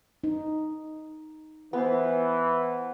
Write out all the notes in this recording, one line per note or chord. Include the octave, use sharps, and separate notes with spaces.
D#4
E3 B3 C5